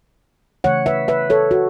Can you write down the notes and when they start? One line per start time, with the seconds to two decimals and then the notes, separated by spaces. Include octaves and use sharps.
0.64 C#3 E3 A3 C#5 F#5
0.86 B4 E5
1.08 B4 E5
1.30 A4 C#5
1.51 F#4